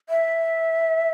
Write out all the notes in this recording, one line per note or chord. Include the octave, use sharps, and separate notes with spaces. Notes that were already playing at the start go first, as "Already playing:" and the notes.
E5